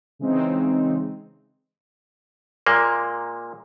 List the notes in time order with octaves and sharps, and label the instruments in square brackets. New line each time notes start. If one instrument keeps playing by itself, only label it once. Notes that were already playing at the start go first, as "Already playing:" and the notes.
[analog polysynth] C#3 E3 G#3 C4 D#4
[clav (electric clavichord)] A#2 G#3 A#3